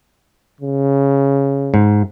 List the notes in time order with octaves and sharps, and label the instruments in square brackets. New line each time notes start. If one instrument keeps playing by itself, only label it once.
[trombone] C#3
[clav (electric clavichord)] G#2